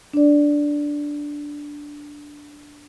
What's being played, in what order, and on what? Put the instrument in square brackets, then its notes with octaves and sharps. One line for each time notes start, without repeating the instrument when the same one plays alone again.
[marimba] D4 D5